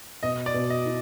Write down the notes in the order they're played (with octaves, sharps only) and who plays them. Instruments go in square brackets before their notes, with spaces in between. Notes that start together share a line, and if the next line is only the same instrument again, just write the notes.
[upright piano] B2 [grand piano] D#5
[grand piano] D5
[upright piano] B2
[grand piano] D#5
[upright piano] E4